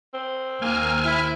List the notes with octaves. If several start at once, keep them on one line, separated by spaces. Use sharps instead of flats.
C4
D#2 A#3 G#5 F6
E4